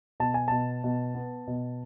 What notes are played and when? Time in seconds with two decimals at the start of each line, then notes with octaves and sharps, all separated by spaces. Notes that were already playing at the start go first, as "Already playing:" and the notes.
0.20 B2 A5
0.34 G#5
0.48 B2 A5
0.84 B2
1.15 B3
1.47 B2